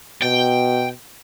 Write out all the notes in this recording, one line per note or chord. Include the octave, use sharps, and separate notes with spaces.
B2 G5